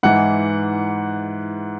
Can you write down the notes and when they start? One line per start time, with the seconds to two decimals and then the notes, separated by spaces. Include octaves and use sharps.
0.03 G#2 E3 F#5